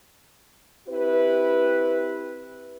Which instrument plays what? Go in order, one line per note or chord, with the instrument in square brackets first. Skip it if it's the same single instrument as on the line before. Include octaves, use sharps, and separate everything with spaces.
[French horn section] C4 E4 G4 B4